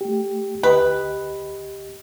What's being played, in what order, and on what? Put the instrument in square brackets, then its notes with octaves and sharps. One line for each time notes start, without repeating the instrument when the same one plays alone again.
[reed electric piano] A3 G4
[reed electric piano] D2 G4 D#5 [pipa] B4